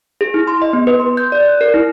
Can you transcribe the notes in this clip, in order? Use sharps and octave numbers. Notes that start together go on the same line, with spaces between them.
G#4
E4
C6
D#5
B3
B4
C6
G6
D5
F#6
A#4
E4